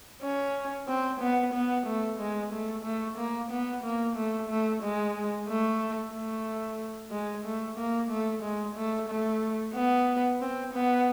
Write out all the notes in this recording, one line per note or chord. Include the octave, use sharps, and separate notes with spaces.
C#4
C4
B3
B3
A3
G#3
A3
A3
A#3
B3
A#3
A3
A3
G#3
A3
A3
G#3
A3
A#3
A3
G#3
A3
A3
B3
C4
B3